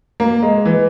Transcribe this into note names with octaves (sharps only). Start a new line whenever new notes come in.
A#3
G#3
E3